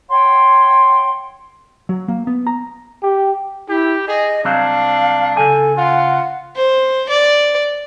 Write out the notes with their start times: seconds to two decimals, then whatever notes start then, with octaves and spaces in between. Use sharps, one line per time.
0.10 C#5 F#5 G5 C6
1.89 F#3
2.08 A#3
2.27 B3
2.47 A#5
3.03 G4
3.69 E4 G4
4.08 G#4 D#5
4.45 C2 F#3 C4 D4 F5
5.37 C#3 A4 G#5
5.77 F4 F#5
6.56 C5
7.09 D5